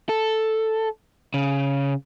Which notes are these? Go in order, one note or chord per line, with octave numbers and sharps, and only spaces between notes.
A4
C#3